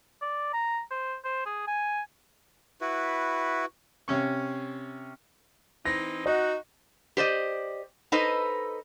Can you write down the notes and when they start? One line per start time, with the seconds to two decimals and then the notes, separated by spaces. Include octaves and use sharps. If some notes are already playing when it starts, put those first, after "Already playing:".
0.21 D5
0.53 A#5
0.90 C5
1.24 C5
1.45 G#4
1.67 G#5
2.81 E4 F#4 B4
4.08 C3 C#4 C#6
5.85 E3 C4 D#4 A#6
6.26 D#4 F#4 D#5
7.17 G4 C5 D5 D#5
8.12 D#4 A4 B4 C5 D#5